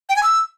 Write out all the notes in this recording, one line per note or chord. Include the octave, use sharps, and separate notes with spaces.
G5
G#5
E6